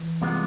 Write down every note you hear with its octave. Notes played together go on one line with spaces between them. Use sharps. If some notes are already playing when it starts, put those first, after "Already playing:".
Already playing: E3
C2 C3 G#3 B3 F4